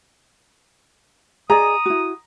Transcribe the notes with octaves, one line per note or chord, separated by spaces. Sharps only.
G#4 D5 D#5 A#5 D#6
E4 F#4